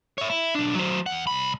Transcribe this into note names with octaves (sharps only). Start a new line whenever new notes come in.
C#5 E5
E4
B1 D4
F#3 C5
E2 F#5
C2 B5